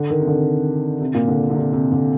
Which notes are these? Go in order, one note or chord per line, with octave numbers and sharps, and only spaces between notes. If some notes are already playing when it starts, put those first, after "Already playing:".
Already playing: D3
D#3
C3
D3
C3
A#2
D3
D3
C3
C3
D3